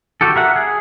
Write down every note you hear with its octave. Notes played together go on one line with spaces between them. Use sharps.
F#4 G4 A4
A#4 E5 F#5
G#4